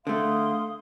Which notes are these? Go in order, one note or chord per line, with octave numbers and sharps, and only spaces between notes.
D3 A3 F5 C6 D#6